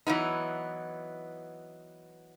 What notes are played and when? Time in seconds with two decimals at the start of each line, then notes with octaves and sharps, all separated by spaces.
0.07 E3 F#3 B3 D#4